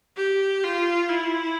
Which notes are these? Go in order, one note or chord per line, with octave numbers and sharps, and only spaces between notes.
G4
F4
E4